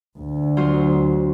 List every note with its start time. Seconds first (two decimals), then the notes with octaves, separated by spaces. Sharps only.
0.19 D2
0.57 F#3 F4 C5